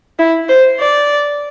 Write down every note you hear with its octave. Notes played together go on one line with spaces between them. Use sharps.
E4
C5
D5